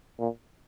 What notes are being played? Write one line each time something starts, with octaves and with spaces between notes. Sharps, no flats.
A#2